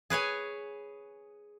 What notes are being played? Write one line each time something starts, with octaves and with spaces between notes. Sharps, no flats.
G#4 B4 C#5 G#5